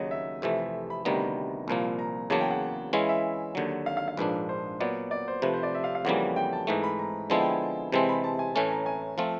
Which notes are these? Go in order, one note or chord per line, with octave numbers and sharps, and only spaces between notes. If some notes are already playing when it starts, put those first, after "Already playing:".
Already playing: D#2 C#3 F#3 D#5
E5
F2 C3 E3 A3 E5
B5
D2 C3 D#3 G3 B3 A#5
C2 A#2 F3 A#3
A#5
E2 C#3 F#3 A#3 A5
G5
F#5
E3 G#3 C#4 E4 F5
E5
D#2 D3 F#3
F5
F5
F5
A#1 G#2 F3 A#3 D4 B4
C5
A#2 F#3 B3 D5
D5
C5
C3 F3 A3 B4
C5
D5
E5
F5
F5
F2 C#3 E3 G3 A#3 F#5
G5
A5
G#2 E3 A3 A#5
B5
A#5
D3 F3 G#3 B3 E4 A5
G5
G#5
C3 E3 G#3 C4 A5
B5
A5
G#5
A2 E3 A3 C#4 A5
A#5
G#5
F3 A3 C4 F4 A5